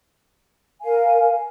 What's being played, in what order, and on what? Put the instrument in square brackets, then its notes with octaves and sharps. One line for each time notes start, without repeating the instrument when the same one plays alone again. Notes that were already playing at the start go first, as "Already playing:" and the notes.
[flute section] A#4 F5 G#5